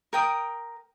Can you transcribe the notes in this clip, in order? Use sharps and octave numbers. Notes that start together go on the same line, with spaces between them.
A#4 G5 D#6